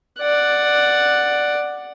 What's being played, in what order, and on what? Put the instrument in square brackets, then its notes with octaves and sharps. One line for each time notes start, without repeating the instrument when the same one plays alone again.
[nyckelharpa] D5 F#5